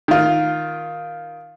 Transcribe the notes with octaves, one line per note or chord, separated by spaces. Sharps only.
D#3 F4